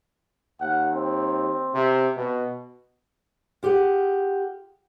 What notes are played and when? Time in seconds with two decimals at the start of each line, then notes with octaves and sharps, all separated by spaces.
0.61 D#2 F#5
0.92 C4
1.74 C3
2.17 B2
3.63 F4 G4 G#4 F#5